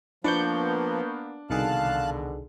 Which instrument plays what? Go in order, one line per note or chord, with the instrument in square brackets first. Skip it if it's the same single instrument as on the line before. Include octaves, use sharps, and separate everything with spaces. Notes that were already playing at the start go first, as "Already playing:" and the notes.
[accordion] F3 [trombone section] A#3 B3 [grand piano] D4 [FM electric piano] B4 C#6 G6
[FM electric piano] C2 D#3 G#4 [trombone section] B2 D3 [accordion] F5 A5 F#6